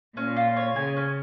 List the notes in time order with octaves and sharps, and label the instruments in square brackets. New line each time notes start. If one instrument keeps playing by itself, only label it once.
[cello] A#2 [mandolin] C#4
[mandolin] F4
C#5
[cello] C#3 [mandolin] G#5
[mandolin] C#4